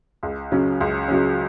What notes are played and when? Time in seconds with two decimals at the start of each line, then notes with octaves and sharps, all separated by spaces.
0.23 C#2
0.52 C#3 F#3 C#4
0.81 C#2
1.08 C#3 F#3 C#4